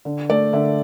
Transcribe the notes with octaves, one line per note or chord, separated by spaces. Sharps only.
D3
A3 D5
D3 E5